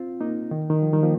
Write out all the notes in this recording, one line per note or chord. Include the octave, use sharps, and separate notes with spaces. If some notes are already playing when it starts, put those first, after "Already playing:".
Already playing: C4 F4
A#3 D#4
D#3
D#3
F3
D#3 G3
F3 A#3